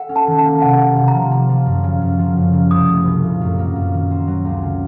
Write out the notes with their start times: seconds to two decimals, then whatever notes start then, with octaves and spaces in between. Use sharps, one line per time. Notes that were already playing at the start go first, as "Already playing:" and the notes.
Already playing: A4 F#5
0.09 C#4
0.16 A5
0.27 D#3
0.38 A5
0.44 A#3
0.62 C3 F#5
0.80 A#3
0.97 C3
1.08 A#5
1.14 F3
1.31 A#3
1.49 F3
1.66 F#2
1.84 C#3
2.01 F#2
2.19 F3
2.37 F#2
2.53 C#3
2.71 C2 D#6
2.88 A3
3.06 C2
3.24 A#2
3.41 F#2
3.59 A#3
3.75 F#2
3.94 D#3
4.11 C4
4.28 F#3
4.45 C#2
4.63 C#3